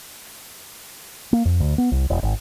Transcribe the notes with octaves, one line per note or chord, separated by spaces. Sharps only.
A#3
F2
D2
B3
C2
E1
G#1